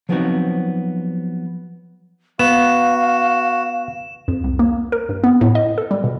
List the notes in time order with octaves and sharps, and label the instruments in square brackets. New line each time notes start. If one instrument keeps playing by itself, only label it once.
[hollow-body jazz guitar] F3 F#3 B3 C4 D#4 F#4
[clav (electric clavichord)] B3 [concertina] F#4 [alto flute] F5 [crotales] E7
[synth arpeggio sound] F2
C2
A#3
A#4
G2
B3
A2
D#5
A4
G3
B2